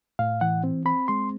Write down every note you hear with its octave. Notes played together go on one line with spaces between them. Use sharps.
A2 F5
E3 F#5
C4
C4 B5
G#3 C6